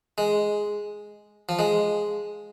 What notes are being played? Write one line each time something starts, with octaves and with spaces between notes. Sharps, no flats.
G#3
F3
G#3